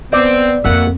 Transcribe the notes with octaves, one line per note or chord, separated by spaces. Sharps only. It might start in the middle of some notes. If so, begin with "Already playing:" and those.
B3 C4 D5
F2 B2 A#3 C4 E5 F#5